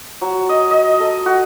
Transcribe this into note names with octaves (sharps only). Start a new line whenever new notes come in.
F#3
D#5
D#5
A4
F#4